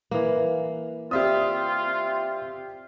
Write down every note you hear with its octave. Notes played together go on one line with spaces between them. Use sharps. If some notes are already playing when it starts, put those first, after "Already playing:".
E3 A#3
C4 F4 G4 C5 D5 E5 D#6